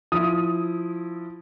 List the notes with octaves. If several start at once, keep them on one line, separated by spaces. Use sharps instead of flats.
F3 E4 D#6